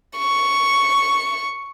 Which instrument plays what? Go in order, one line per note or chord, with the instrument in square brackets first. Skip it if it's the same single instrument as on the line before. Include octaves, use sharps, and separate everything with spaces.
[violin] C#6